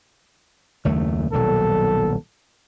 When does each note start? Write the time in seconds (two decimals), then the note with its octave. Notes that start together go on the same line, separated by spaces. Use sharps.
0.85 F#1 D#2 A3
1.33 D#1 B1 F#3 A4